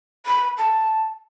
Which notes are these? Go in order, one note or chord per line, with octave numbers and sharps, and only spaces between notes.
B5
A5